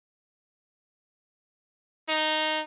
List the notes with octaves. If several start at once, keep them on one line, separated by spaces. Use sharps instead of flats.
D#4